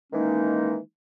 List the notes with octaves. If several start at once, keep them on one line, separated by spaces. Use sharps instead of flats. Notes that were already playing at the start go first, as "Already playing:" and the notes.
D#3 E3 G#3 A#3 C#4 D#4